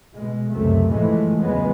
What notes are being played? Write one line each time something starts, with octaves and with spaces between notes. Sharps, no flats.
B2 G#3
C#2 F#2 C3 A3
A2 E3 F3 G#3 A3
E2 C#3 F3 F#3 G#3 B3